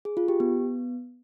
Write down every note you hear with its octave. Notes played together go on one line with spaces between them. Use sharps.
G#4
F4
G4
B3